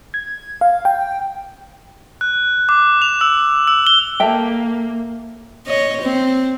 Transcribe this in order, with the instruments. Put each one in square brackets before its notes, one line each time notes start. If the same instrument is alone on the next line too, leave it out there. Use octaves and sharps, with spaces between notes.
[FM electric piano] G#6
F5
G5
[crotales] F#6
D6
F7
E6
E6
G7
[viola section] A#3 [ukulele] A4 E5 G5
[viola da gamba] C#5 D#5
C4